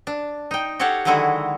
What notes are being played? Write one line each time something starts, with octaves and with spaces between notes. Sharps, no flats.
D4
D#4 G5
F#4 G4 A4 C#5 F5 F#5
D3 D#3 F#3 G#3 E4 F#4